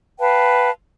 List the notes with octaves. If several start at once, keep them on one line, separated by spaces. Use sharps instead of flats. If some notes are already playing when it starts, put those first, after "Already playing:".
B4 F5 G5 A5